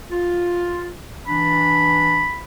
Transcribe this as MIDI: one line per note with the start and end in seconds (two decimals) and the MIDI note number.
0.11 0.89 65
1.27 2.25 52
1.27 2.25 62
1.27 2.44 83